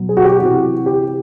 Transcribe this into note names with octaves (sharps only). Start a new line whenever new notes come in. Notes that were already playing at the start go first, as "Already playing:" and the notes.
Already playing: B2 F#3
G#4
F#4
G4
C3 E3 F#4
G4